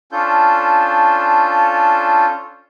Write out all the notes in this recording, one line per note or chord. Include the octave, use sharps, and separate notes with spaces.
C#4 D4 F4 A4 G6